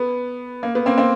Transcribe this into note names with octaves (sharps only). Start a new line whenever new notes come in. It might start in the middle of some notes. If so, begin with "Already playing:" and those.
Already playing: B3
A#3
B3
A#3 C4
A#3 C4